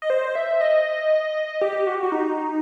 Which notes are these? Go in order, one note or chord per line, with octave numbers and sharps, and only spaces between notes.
D#5
C5
E5
D#5
G4
F#4
G4
F#4
D#4